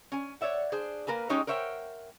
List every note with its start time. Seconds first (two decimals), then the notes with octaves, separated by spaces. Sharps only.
0.12 C#4 G#5
0.41 C#5 D5 E5 F#5
0.72 D4 G#4 C5
1.07 A#3 A#4 B4 G#5
1.29 G#3 C#4 D#4 G4 C#5 D#5
1.47 A#4 C5 C#5 E5 F#5 G5